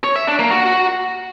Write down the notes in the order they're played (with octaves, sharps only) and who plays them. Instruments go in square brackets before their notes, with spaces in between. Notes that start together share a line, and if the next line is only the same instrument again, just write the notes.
[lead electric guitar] C#5
E5
D4
A#3
F#4